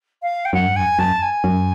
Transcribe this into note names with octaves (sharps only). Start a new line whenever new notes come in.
F5
G5
F#2 F#5
G2
F#2 G#5
F#2 A5
G#5
F#2